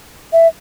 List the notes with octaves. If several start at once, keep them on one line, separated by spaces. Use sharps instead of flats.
E5